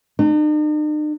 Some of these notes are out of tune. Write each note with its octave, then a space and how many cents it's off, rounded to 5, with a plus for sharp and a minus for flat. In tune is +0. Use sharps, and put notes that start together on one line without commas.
D#4 -45